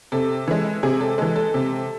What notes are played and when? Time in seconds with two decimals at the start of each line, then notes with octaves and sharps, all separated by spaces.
0.12 C3 A4
0.48 E3 G#3
0.83 C3 G#4
1.01 A4
1.18 E3 G#3 A4
1.36 A4
1.54 C3